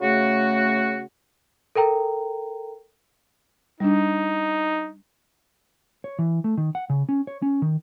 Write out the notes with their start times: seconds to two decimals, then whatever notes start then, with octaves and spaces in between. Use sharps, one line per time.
0.01 C#3 A3 F#4
1.75 A4 A#4 G5 A#5
3.80 G3 D4 D#4
6.04 C#5
6.19 E3
6.44 A3
6.57 D#3
6.75 F#5
6.90 C#3
7.09 C#4
7.27 C#5
7.42 C#4
7.62 D#3